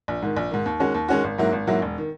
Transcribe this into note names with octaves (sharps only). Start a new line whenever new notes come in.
A#1
G#2 D#3
A#1
G#2 D#3
D#2
D#3 G#3 C#4 F#4
D#2
D#3 G#3 C#4 F#4
G#1
G#2 F#3 A#3 E4
G#1
G#2 F#3 A#3 E4
E1
D#3